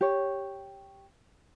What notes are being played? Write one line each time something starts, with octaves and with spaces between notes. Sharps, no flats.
G4 C#5